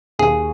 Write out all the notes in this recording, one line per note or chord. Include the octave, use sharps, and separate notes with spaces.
D#2 G#4